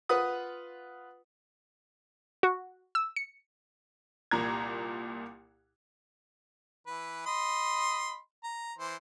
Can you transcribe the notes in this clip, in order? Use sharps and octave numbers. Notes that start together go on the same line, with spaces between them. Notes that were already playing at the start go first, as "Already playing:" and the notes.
F4 B4 F#5 D#6
F#4
E6
C#7
C2 A#2 A#5 G#6
E3 B4
D#5 B5 C6
A#5
E3 C5